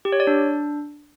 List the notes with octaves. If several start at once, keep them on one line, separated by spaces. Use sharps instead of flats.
G4
C#5
D5
D4